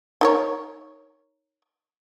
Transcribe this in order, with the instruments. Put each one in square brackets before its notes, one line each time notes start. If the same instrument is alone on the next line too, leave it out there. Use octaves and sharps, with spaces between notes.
[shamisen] D#4 A#4 C#5